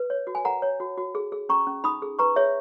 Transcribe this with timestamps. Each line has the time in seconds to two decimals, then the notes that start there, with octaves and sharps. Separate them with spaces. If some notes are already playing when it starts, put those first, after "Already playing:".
Already playing: B4
0.10 C#5
0.27 F#4
0.35 G#5
0.45 A#4 F#5 A#5
0.62 C#5
0.80 F#4
0.98 F#4
1.15 G#4
1.32 G#4
1.49 C#4 A#5 C#6
1.67 C#4
1.84 D#4 B5 D#6
2.02 G#4
2.19 B4 A#5 C#6
2.36 G#4 C#5 E5